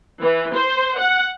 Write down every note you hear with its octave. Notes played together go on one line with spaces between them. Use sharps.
E3
C5
F#5